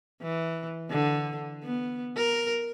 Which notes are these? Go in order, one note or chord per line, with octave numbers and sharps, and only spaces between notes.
E3
D3
B3
A#4